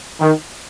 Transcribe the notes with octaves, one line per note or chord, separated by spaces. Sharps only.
D#3